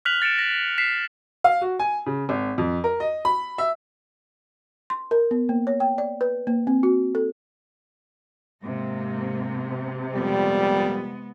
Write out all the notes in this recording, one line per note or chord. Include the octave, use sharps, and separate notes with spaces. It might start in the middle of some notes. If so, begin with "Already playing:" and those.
F6 F#6 B6 F7 F#7
A6 C#7 D7 E7
A#6
B6 C7 E7
F5
F#4
G#5
C#3
G#1
F2
A#4
D#5
B5
E5
C6
A#4
B3
A#3
C#5
G5
D5
B4
A#3
C4
F#4
A4
G#2 C3 A#3
F2 A#2 G3 G#3 B3